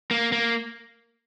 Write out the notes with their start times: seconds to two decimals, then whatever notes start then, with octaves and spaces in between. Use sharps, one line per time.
0.11 A#3
0.32 A#3